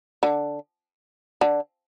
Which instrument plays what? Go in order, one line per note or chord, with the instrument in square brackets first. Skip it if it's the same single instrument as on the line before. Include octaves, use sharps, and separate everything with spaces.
[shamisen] D3
D3